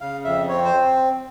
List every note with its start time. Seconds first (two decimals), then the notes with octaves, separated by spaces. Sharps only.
0.01 C#3 F5
0.25 F2 E5
0.49 C4 C#5
0.65 C5